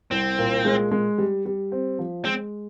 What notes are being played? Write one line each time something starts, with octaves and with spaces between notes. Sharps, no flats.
C2 C4
A#2
G#3
G#3
G3
G3
C4
F3
G#3 C4